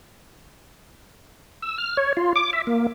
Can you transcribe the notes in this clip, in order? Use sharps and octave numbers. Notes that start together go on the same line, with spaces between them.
E6
F6
C#5
F4
D6
E5
A#3